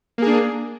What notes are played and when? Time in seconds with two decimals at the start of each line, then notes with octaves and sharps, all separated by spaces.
0.18 A#3
0.22 G#4
0.26 D4